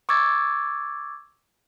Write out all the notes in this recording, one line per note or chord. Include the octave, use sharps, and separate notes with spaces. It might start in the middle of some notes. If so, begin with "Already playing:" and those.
C#6 D6 E6 G#6 A6